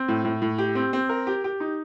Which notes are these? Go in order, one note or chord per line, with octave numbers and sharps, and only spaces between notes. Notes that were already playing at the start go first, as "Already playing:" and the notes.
Already playing: C4
A2
A2
A2
G4
C4
C4
A#4
G4
G4
D#4